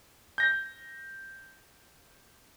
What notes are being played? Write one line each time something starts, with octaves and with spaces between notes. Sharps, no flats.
G6 A#6